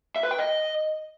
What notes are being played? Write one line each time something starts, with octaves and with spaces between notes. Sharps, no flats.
E5
B4
G5
D#5